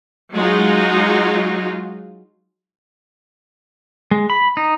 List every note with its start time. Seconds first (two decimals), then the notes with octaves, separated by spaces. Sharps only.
0.33 F#3 G#3 D#4 F4
4.11 G#3
4.30 B5
4.57 D#4